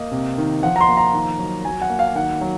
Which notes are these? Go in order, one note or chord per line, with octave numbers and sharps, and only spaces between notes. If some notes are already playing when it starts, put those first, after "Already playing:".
Already playing: A#3 D#5
C3
D#3
F3 F#5
A#5
C6
A#3
A#5
D#3
F#3
F#3 G#5
F#5
A#3
F5
D#3 F#5
F#3